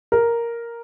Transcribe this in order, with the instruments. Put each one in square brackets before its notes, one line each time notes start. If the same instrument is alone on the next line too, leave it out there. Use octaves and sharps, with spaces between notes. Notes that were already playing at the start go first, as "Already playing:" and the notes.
[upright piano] A#4